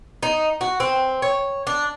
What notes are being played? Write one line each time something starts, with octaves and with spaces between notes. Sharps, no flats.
D#4
F#4
C4
C#5
D4